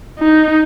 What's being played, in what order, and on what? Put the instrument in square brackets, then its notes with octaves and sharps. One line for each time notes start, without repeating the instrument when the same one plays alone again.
[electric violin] D#4